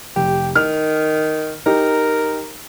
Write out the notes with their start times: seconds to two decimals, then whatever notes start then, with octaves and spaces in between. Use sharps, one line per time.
0.16 F1 G4
0.55 D#3 F6
1.66 D#4 G4 A#4